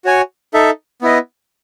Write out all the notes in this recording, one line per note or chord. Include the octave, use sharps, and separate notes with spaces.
F#4 C#5 G#5
D#4 A4 E5
B3 E4 B4 D#5